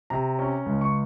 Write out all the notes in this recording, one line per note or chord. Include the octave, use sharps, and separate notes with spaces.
C3 A#5
C#4
C#2
C#6